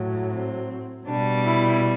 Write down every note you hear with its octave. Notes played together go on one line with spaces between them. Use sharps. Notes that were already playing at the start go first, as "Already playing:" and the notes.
Already playing: A2 F#3
C4
B2 G3 D4
E4